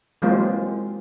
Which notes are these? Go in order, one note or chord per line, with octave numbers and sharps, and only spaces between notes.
E3 F#3 G#3 A#3 C4 F4